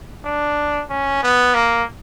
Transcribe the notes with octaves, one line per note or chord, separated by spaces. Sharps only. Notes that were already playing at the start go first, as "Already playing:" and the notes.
D4
C#4
B3
A#3